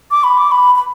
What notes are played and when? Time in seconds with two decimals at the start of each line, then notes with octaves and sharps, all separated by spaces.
0.11 D6
0.24 B5
0.37 D6
0.51 B5
0.76 B5